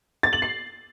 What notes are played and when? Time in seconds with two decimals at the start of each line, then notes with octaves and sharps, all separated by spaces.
0.23 A6
0.33 F#7
0.42 C7